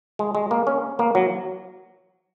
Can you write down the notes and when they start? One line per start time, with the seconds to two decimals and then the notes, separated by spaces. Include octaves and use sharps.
0.19 G#3
0.35 G#3
0.51 A#3
0.67 C#4
0.99 A#3
1.15 F#3